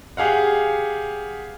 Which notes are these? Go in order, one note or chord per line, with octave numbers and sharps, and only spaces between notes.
G4 G#4 F5 F#5